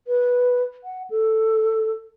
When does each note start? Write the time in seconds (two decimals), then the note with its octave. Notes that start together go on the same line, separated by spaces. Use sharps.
0.07 B4
0.84 F#5
1.10 A4